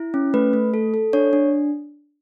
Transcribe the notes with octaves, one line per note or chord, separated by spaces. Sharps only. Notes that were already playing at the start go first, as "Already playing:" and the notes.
Already playing: E4
C#4
A3 B4
A3
A4
A4
D4 C#5
D4